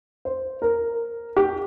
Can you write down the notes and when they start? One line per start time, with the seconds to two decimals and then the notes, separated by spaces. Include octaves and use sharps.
0.25 C5
0.62 A#4
1.36 G4